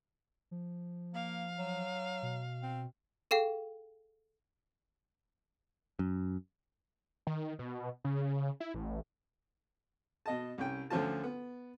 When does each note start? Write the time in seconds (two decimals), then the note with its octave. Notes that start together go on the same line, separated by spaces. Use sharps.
0.51 F3
1.14 A#3 F5
1.59 F#3
2.22 B2
2.62 C4
3.31 G#4 A4 F5 G5
5.99 F#2
7.27 D#3
7.59 B2
8.04 C#3
8.60 E4
8.74 A1
10.26 B2 D#5 A5
10.58 C2 C#4 G5
10.90 D2 D3 F3 C#4 F4 A5
11.23 B3